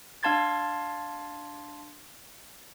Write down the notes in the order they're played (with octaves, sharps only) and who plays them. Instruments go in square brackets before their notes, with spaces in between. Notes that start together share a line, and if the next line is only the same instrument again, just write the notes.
[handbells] D4 F5 A5 C6 G#6 A6